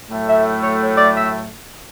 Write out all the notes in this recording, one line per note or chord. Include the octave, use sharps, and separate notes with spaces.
A2 F#3 A3
E5
C#5
C#5
D5
E5